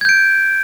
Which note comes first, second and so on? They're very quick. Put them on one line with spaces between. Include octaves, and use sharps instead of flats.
G#6 G6 D7